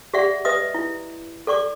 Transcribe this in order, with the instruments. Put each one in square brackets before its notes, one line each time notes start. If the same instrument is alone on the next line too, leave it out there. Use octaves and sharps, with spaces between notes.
[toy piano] G4 G#4 D5 E5 F#5 C#6
B4 D#5 E5 D#6
E4
A4 D5 C#6 D6